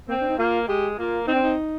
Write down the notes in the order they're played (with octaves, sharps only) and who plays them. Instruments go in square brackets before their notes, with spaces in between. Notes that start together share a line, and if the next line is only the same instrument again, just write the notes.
[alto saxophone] A#3 [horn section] C4
[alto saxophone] D4
D#4
[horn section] A#3 [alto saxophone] F4
[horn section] G#3 [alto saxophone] G4
[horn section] A#3 [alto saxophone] F4
[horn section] C4 [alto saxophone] D#4
[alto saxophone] D4
D#4